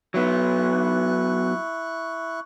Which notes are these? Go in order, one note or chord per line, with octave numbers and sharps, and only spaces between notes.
F#3 B3 E4 C#6 F#6